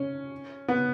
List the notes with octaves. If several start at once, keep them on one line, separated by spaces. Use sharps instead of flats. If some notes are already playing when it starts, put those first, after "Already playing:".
Already playing: C#4
B3